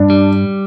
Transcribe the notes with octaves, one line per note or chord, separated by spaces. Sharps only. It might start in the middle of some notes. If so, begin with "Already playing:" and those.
Already playing: G2 D4
G3